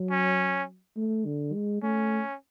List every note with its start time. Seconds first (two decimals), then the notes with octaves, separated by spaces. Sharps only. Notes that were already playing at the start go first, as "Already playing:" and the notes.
Already playing: F#3
0.11 C#4
0.97 A3
1.26 D3
1.54 G#3
1.83 A3 C#4